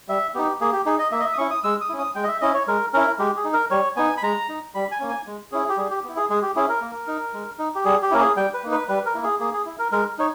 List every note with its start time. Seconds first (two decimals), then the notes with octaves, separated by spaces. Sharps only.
0.08 G3 E5
0.34 B3 D#4 G4
0.61 A#3 G#4
0.73 G4
0.86 D#4 G#4
0.99 D#5
1.12 A#3 E5
1.20 D#5
1.25 E5
1.33 D#6
1.38 C#4 E4 C#6
1.51 D#6
1.64 G#3 E6
1.81 D#6
1.89 C#4 E4
1.99 D#6
2.15 G#3 G5
2.24 D#5
2.28 E5
2.41 C#4 E4 D#5
2.54 C#5
2.67 G#3 A#4
2.93 C#4 E4 A#4
3.19 G#3 G4
3.36 G#4
3.44 D#4
3.53 A#4
3.71 G3 C#5
3.96 B3 D#4 G#5
4.17 B5
4.23 G#3 A#5
4.49 D#4
4.74 G3 B5
4.92 G#5
5.00 A#3 C#4
5.09 G#5
5.27 G#3
5.52 C#4 E4 G#4
5.69 G4
5.78 G3 G#4
5.90 G4
6.04 B3 E4
6.16 G#4
6.30 G#3 G#4
6.42 G4
6.56 C#4 E4 G#4
6.69 A#4
6.81 A#3
7.07 D#4
7.34 G#3
7.59 D#4
7.75 G4
7.85 G3 G#4
8.02 G4
8.11 A#3 C#4 E4 A#4
8.20 G#4
8.36 G3 G5
8.54 B4
8.63 A#3 D#4
8.71 B4
8.88 G3 B4
9.06 A#4
9.14 A#3 E4
9.24 G#4
9.40 A#3 G#4
9.53 G#4
9.66 E4
9.79 A#4
9.92 G#3 A#4
10.19 D#4 C#5